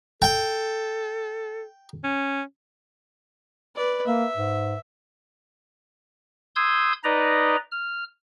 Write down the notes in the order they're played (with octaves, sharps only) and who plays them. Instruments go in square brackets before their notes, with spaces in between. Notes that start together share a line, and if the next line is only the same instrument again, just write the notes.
[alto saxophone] A4 [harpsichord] G5
[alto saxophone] C#4
[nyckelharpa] B4 D5
[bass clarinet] A#3 [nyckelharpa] E5
[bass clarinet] G#2
[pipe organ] C6 D#6 E6 G6 G#6
D#4 B4 D5 D#5 A#5
F6